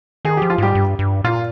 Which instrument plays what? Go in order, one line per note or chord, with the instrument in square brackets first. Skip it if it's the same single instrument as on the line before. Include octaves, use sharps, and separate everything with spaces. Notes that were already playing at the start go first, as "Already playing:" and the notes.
[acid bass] D#3 [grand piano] G#4
[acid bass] F3 [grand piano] G4
[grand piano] F4
[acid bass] G#2 [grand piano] G3 G4
[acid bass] G2
G2
[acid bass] A#2 [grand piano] F4